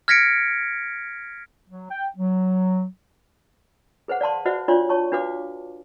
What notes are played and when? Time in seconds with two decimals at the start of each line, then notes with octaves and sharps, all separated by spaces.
0.08 F6 G#6 A#6 B6 C#7 D7
1.69 F#3
1.91 G5
2.17 F#3
4.08 G#4 B4 C5 F#5
4.21 D5 F5 A5 C6
4.46 F#4 B4 C5 D5 E5 F#5
4.68 D4 F4 C#5 D5 C6
4.89 C#5 A5 C#6
5.12 D4 F#4 B4 F5 D6